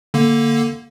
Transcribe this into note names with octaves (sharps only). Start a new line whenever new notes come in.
D3 A#3